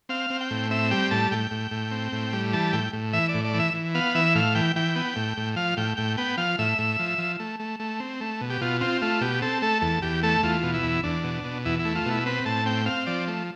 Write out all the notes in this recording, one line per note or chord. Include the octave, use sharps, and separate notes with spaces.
C4 F5
C4
G5
A2
C4 E5
G3 G5
A2 A5
A2 G5
A2
A2
C4
A2
G3
E3 A5
A2 G5
A2
E3 E5
D5
A2
D5
E3
E5
E3
B3 F5
E3 E5
A2 F5
E3 G5
E3 G5
B3
A2
A2
F3 F5
A2 G5
A2 G5
B3 G5
F3 F5
A2 E5
A2
F3
F3
A3
A3
A3
C4
A3
B2
G4
B2 F4
C4 F4
A3 F4
B2 G4
C4 A4
A3 A4
E2 A4
E2 G4
A3 A4
E2 F4
B2
E4
E2
E2 D4
B2
B2
E2 E4
E4
A3
F4
B2 E4
C4 B4
A2 A5
C4 G5
C4 F5
F3 D5
A3